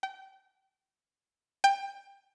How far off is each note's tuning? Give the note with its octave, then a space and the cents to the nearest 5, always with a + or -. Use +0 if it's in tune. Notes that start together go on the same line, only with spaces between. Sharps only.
G5 -25
G5 +20